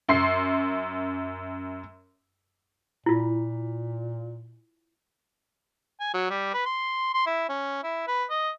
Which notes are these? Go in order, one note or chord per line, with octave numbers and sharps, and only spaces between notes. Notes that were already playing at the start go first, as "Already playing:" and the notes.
F#2 C6 C7
A#2 E4 F4
G#5
F#3
G3
B4
C6
C6
E4
C#4
E4
B4
D#5